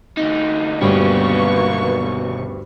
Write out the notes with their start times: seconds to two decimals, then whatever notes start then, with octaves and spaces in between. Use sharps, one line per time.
0.17 D2 D#4
0.81 D2 G2 B2 G3 A#3 B3 C#4 C#6